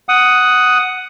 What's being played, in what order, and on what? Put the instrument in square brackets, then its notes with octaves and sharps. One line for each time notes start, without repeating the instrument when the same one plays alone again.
[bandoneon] F#5 D#6